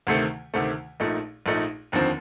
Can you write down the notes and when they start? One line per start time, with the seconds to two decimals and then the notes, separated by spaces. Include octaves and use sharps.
0.07 D2 C3 D#3 A3
0.54 D2 C3 D#3 A3
1.00 A#1 A#2 A3 D#4
1.46 A#1 A#2 A3 D#4
1.92 F1 D#2 D3 F3 C4